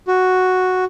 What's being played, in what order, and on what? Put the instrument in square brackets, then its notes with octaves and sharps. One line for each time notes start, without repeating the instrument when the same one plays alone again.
[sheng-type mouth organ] F#4